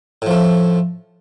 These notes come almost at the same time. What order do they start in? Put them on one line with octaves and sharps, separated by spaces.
A2 F3 A3